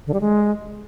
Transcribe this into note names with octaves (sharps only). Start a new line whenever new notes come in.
D3
G3
G#3